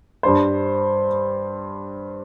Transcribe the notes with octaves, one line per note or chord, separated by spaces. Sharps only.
G2 G3 D4 C5